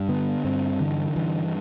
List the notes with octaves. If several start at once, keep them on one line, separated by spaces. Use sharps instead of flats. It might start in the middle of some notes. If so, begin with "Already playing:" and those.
Already playing: G2
D3 B3
G2 C4
D3 E3
G2 E3